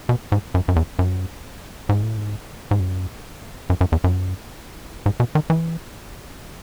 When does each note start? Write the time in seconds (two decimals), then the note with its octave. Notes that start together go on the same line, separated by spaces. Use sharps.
0.09 B2
0.32 G#2
0.54 F#2
0.68 F#2
0.76 E2
0.99 F#2
1.89 G#2
2.03 A2
2.17 G#2
2.71 G#2
2.80 F#2
3.70 F#2
3.81 F#2
3.92 E2
4.04 F#2
5.06 G#2
5.20 B2
5.35 D#3
5.50 E3